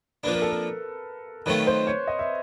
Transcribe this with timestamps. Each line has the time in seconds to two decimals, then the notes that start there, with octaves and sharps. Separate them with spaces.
0.24 F3 A#3 D4 B4
0.33 A#4
0.42 A4
0.50 A#4
1.46 D#3 F#3 A3 C4 F4 B4
1.67 C5
1.87 C#5
2.07 D#5
2.19 E5